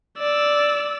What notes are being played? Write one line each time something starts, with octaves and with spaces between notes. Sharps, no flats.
D5 E6